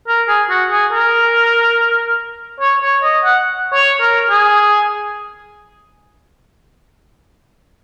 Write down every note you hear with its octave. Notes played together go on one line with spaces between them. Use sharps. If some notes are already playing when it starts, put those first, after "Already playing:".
A#4
G#4
F#4
G#4
A#4
C#5
C#5
D#5
F#5
C#5
A#4
G#4